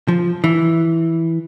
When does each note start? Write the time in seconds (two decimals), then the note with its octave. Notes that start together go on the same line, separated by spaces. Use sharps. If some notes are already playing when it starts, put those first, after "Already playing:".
0.08 F3
0.44 E3